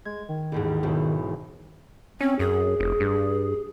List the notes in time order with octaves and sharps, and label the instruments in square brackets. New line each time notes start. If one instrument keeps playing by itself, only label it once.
[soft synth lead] G#3 [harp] G#6
[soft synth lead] D#3
[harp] A1 D#2 G#2
E1 B1
[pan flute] C4 [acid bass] C#4
[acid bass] F#2 [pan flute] G#4
[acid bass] F1
G2